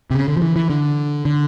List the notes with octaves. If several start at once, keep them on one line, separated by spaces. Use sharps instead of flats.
C3
C#3
D3
F3
E3
E3
D3
D3